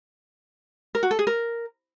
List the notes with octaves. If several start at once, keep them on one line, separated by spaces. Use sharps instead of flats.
A#4
F#4
A4
G#4
A#4